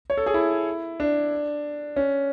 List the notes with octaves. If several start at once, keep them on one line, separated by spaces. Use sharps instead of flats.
C#5
A4
G#4
E4
D4
C#4